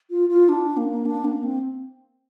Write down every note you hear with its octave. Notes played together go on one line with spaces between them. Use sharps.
F4
F4
D4
A#3
D4
A#3
C4